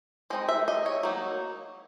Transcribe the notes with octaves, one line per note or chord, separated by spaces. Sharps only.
G#3 C4 D#4 D#5
E5
D#5
C#5
F#3 A#3 D#4